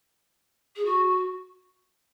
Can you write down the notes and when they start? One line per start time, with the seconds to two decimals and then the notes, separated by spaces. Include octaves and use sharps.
0.76 G#4
0.85 F#4